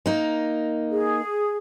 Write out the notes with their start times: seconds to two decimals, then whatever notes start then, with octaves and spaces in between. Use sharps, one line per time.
0.06 A#3 D#4
0.91 G#4